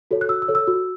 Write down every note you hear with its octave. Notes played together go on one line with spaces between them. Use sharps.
F#4 A4 C#5
F#6
F#4 E6
E6
A4 C#5
E6
F#4